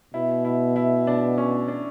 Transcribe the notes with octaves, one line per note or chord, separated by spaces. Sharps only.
B2 E4
E4
E4
D4
C#4
D4